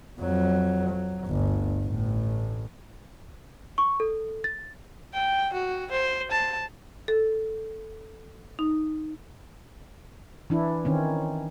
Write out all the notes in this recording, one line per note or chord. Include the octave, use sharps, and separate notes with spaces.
F2 F#3
F#3
G1 D2
A1 A2
C#6
A4
A6
G5
F#4
C5
A5
A4
D#4
E3 D4 E4
D#3 C4 C#4